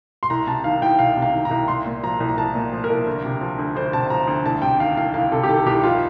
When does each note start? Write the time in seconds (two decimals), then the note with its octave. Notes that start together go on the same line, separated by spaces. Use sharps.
0.23 C6
0.30 C2 A#5
0.47 C3 A5
0.64 D#3 F5
0.81 C2 G5
0.99 C2 F5
1.17 C3
1.22 F5
1.34 D#3
1.45 A#5
1.51 C2
1.68 C2 C6
1.86 A#2
2.03 F3 A#5
2.20 C2
2.29 A#5
2.37 C2 A5
2.55 A#2
2.73 F3
2.84 A#4
2.90 C2
3.07 D2
3.25 C3
3.41 F3
3.59 D2
3.75 D2 C5
3.93 C3 A5
4.10 F3 A#5
4.27 D2
4.45 C2 A5
4.62 C3 G5
4.80 D#3 F5
4.97 C2 F5
5.14 C2 F5
5.32 C3 A4
5.43 G4
5.48 D#3 A4
5.66 C2 G4
5.83 F1 F4